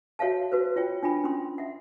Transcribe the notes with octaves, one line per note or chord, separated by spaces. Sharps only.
F#4 C#5 E5 F5 A5
F#4 B4 C5
F4 C#5 G5
D4 F4 G5 B5
C#4 C6
E5 F#5